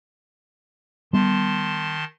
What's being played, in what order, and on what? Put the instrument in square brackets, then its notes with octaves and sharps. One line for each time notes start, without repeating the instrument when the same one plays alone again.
[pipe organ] D#3 A5 C6 [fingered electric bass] G3 B3